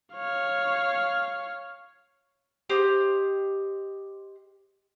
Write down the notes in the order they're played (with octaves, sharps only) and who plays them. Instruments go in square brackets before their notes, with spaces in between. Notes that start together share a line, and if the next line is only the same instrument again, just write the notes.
[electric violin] C#5 F5
[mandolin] G4 C5 D#5